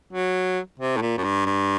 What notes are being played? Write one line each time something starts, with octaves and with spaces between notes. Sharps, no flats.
F#3
C3
A2
A#2
F#2
G2
G2